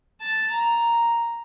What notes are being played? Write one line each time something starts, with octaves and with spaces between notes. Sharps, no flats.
A5
A#5